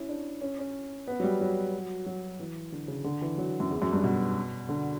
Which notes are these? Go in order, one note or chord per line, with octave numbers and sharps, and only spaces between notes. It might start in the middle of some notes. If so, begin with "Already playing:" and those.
Already playing: C#4 E4
D4
C#4
C#4
B3
F#3
G3
F#3
F#3
E3
D3
C#3
D3
E3
F#3
F#2
E2
F#2
G2
B2
D3